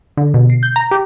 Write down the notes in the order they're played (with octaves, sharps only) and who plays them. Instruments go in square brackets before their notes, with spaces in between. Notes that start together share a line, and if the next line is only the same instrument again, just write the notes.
[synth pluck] D3
B2
C7
G6
A#5
G4